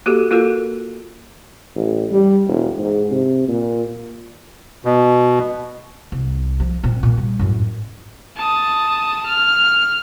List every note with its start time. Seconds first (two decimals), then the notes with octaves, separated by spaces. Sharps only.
0.06 A#3 F#4 G4 A4
0.31 A#3 F4 F#4 A4 A#4
1.75 A1
2.11 G3
2.48 E1
2.79 G#2
3.11 C3
3.48 A#2
4.85 B2
6.12 C2
6.60 F3
6.84 A#2 C4
7.03 A#2
7.17 G3
7.39 F#2 A2
8.37 A5 D#6
9.26 F6